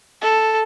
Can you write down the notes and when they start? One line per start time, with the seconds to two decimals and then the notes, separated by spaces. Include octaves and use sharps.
0.22 A4